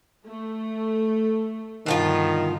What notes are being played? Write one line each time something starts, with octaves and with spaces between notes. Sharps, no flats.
A3
G2 B2 D3 D#3 F3 F4